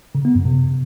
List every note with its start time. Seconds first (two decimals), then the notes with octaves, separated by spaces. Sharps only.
0.15 C#3
0.25 B3
0.35 F#2
0.45 C3